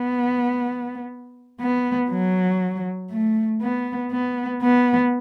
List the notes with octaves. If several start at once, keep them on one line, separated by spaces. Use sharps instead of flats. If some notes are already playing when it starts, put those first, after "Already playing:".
Already playing: B3
B3
F#3
A3
B3
B3
B3